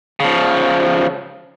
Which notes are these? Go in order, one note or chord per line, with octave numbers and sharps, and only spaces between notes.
C#3 F3